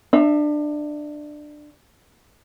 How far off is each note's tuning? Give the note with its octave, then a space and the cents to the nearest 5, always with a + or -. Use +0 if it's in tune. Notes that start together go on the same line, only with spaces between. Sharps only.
D4 +20 E5 +0